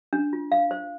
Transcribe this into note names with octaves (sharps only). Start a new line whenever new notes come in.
D4
F4
F5
C5